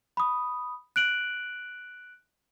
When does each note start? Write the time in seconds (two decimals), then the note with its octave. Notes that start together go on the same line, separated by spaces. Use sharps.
0.17 B5 D#6
0.96 F#6 D7 F#7